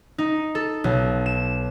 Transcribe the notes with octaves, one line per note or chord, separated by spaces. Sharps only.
D#4
A4
B1
E7